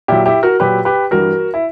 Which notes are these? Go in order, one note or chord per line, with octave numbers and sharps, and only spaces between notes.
A#2 F#3 E4 G4
E4 G4
F#4 A#4
A#2 F#3 G4 B4
G4 B4
G2 E3 G3 F#4 A#4
E4